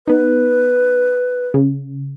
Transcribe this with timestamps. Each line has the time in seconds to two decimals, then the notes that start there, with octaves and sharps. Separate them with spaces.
0.08 B3 D#4 B4
1.54 C#3